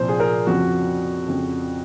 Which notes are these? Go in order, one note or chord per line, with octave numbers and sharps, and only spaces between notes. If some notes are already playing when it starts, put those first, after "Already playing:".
Already playing: C2 A#2 F3 C5
G#4
A#4
F2 C#3 F3 F#4
F2 C#3 F3